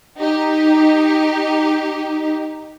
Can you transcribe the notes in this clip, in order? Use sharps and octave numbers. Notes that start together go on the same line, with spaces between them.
D#4 G4